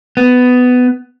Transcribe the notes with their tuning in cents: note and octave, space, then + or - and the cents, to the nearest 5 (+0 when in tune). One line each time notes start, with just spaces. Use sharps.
B3 +15